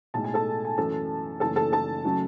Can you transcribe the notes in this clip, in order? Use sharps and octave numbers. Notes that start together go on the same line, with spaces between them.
B1 A2 G#3 A5
G#5
A4 A5
G#5
F#2 E3 A3 A4 A5
F#1 F#2 E3 A3 A4 A5
A4 A5
A4 A5
C#3 F#3 A3